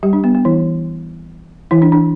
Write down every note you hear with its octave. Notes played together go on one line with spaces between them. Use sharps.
G3 G4
D4
B3
B3
E3 E4
E3 E4
D4
D4